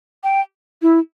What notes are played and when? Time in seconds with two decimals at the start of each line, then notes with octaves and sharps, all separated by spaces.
0.24 G5
0.82 E4